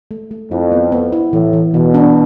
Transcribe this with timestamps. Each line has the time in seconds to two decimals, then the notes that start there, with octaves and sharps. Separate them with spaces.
0.11 A3
0.31 A3
0.51 F2 E4
0.72 B3
0.92 B3
1.12 E4
1.32 A2 E3
1.53 E3
1.73 B2 E3
1.94 D4